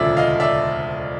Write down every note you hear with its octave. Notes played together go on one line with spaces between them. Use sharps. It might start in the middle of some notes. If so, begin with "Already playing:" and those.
Already playing: E1 D2 C#3 F3 D5 E5
D#5 F5
D5 E5